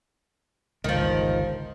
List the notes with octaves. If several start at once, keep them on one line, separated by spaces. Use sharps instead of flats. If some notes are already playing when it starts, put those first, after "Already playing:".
G1 C#2 D#3 F3